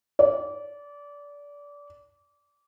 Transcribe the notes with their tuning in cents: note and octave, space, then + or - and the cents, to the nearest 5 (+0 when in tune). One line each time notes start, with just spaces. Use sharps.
D5 -25